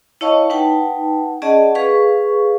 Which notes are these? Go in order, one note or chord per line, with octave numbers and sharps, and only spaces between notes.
E4 C#5 D#5 F5 A5 C#6
D#4 B4 F#5 G5 A5
C#4 G#4 D5 D#5 F#5 A5
G#4 B4 F5 C#6